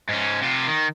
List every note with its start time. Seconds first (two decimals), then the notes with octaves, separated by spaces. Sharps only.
0.10 G#2 C#4
0.43 C3 F4
0.68 D#3